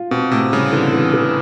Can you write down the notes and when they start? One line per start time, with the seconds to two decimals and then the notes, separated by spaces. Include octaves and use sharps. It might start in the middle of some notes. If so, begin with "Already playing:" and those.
Already playing: F4
0.11 B2 C4
0.32 A2 C3
0.52 C#3 G3
0.73 D3 E3
0.93 E3
1.14 E3